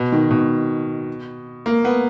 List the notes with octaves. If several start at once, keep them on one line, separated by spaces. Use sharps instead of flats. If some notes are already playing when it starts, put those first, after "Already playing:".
Already playing: B2
D#3
B2
A#3
B3